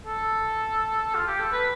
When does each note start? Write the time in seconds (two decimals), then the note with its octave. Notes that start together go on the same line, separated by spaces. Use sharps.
0.06 A4
1.15 F4
1.27 G4
1.40 A4
1.52 B4